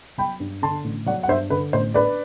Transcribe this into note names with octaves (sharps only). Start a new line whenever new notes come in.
F#3 G5 B5
G2
D3 A5 C6
A1
F#3 D5 F#5
F#5
G2 C5 E5
D3 B4
A1 C5
D4 B4 D5